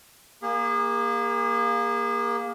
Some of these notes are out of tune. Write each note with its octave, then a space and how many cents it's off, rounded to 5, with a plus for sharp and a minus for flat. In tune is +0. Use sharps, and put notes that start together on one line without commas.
A#3 +10 G#4 -35